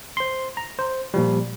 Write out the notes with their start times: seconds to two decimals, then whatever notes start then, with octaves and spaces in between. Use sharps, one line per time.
0.17 C5 C6
0.57 A#5
0.79 C5
1.14 A#2 F3 G3